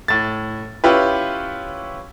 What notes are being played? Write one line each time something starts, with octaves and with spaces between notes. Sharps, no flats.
A2 A6
C#4 E4 F4 G4 B4